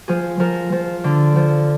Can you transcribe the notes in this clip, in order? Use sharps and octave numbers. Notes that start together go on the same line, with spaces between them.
F3 G#4
F3 A#4
F3
D3
F3